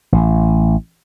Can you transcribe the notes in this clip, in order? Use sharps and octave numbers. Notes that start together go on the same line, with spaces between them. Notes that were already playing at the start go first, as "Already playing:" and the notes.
A1